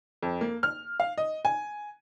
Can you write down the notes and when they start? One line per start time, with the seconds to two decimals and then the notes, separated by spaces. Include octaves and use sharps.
0.22 F2
0.41 A#3
0.63 F6
1.00 F5
1.18 D#5
1.45 G#5